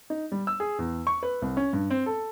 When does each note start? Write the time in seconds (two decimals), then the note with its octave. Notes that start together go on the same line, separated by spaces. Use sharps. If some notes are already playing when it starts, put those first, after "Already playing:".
0.10 D#4
0.32 G3
0.47 E6
0.60 G#4
0.79 E2
1.07 C#6
1.23 B4
1.42 C2
1.57 C#4
1.73 G2
1.90 C4
2.06 A4